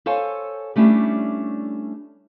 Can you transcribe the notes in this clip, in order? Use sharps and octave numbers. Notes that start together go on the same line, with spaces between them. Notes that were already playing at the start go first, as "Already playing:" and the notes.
A4 C5 C#5 F5 G#5
G3 A3 C#4 D4 E4 G4